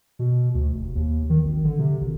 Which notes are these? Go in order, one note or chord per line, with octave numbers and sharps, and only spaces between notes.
B2
D2
F1
D#2
D#3
G#1
D3
C3
G#1